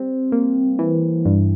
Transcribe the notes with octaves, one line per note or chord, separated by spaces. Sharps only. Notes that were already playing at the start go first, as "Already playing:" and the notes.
Already playing: G3 C4
A#3
E3
G2